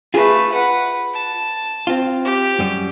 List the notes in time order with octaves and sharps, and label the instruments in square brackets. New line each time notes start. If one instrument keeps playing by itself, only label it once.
[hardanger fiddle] A3 B4 [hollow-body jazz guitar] F4 G#4
[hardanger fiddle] B4 F#5
A5
[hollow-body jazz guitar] C4 F4
[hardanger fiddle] G4
[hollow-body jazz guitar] F#2 G3